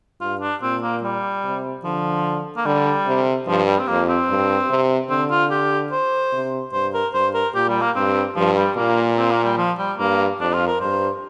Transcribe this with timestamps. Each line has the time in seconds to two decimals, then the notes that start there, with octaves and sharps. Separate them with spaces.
0.21 G2 F4
0.41 D4
0.61 A#2 C4
0.82 A#3
1.03 G3
1.44 C3
1.84 D3 F3
2.57 A#3
2.65 D3 G3
3.06 C3
3.47 G2 F3
3.67 G3
3.79 C4
3.88 F2 A#3
4.09 C4
4.29 G2
4.70 C3
5.10 D3 C4
5.31 F4
5.51 G4
5.92 C5
6.33 C3
6.73 G2 C5
6.94 A#4
7.14 G2 C5
7.34 A#4
7.54 A#2 G4
7.69 G3
7.81 A#3
7.95 G2 C4
8.36 G2 F3
8.57 G3
8.77 A#2 A#3
9.18 C4
9.31 A#3
9.44 G3
9.58 F3
9.78 G3
9.98 G2 A#3
10.40 F2 D4
10.53 F4
10.67 A#4
10.80 G2 C5